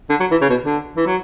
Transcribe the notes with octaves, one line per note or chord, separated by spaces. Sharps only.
D3
F#3
E3
C#3
B2
D3
E3
F#3